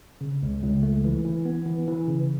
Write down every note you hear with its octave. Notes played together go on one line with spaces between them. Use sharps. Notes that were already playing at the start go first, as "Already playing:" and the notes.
C#3
C#2
C#2
A3
E3
E3
B3
E3
E3
C#3